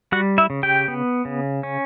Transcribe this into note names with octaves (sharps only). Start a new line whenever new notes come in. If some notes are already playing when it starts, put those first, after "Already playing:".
G3 F#4 F#5
E4 E5
C#3
G4 G5
B3
C#3
C#4